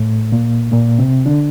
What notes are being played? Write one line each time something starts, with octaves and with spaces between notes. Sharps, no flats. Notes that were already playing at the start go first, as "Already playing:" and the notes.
Already playing: A2 A3
A#2 A#3
A#2 A#3
C3 C4
D3 D4